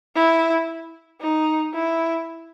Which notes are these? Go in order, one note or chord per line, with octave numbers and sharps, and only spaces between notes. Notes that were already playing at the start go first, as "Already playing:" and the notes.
E4
D#4
E4